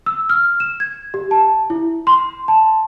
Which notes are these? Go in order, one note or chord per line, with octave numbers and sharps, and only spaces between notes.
E6
F6
E7
G#6
G4
A5
E4
C6
A5